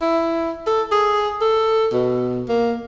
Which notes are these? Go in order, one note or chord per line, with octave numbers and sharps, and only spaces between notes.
E4
A4
G#4
A4
B2
A#3